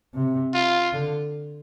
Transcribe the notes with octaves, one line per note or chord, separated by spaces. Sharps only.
C3
F4
D3